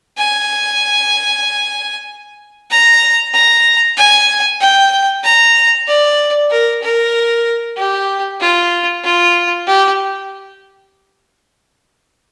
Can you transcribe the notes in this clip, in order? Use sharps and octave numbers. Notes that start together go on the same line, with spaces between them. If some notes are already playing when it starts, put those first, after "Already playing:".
G#5
A#5
A#5
G#5
G5
A#5
D5
A#4
A#4
G4
F4
F4
G4